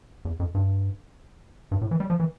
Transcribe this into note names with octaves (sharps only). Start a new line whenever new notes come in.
E2
F2
G2
G2
A2
E3
G3
F3
E3